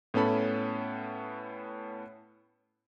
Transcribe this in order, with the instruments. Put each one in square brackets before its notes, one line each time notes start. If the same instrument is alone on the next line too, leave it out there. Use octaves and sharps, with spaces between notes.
[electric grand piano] A2 B3 C#4 A4 B5